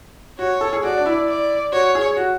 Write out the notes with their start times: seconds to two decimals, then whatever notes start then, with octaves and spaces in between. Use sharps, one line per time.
0.39 F#4 C#5
0.61 A4
0.73 G#4
0.83 F#4 D5
0.98 D4
1.06 E4
1.28 D5
1.72 F#4 C#5
1.95 G#4
2.17 F#4